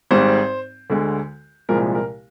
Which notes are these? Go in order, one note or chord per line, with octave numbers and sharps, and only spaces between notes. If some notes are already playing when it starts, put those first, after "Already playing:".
G#1 G#2 G3 C5
D2 D3 G#3
C2 A#2 F3 G#3 A#4
A#4